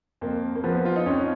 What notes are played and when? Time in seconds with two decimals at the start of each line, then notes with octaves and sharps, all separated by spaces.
0.21 F2 A#3
0.55 A#3
0.64 F3 B3
0.85 F4
0.96 D#4
1.06 F2 C#4